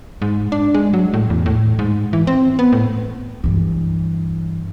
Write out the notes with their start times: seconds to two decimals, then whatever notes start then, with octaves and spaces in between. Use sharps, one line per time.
0.22 G#2
0.52 D4
0.74 G#3
0.94 F#3
1.14 A2
1.30 E2
1.46 A2
1.79 G#2
2.13 E3
2.27 C4
2.59 B3
2.72 A2
3.44 G2 E3